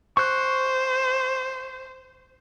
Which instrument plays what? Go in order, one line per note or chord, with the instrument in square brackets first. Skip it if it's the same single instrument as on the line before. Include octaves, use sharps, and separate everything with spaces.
[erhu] C5 [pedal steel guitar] C#6 F#6